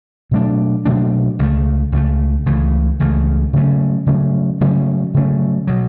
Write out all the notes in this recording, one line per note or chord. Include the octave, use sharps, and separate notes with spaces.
B2 F#3 A3 D4
B2 F#3 A3 D4
C#2 C#3 E3 A3
C#2 C#3 E3 A3
C#2 C#3 E3 A3
C#2 C#3 E3 A3
C#3 F#3 A3 C#4
C#3 F#3 A3 C#4
C#3 F#3 A3 C#4
C#3 F#3 A3 C#4
B2 F#3